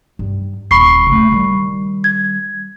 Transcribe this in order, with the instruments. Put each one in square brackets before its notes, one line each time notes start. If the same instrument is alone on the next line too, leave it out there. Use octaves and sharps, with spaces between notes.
[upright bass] G2
[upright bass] D#1 [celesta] B5 C#6 C7
[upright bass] C#3 A3
D#3 G3
[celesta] G#6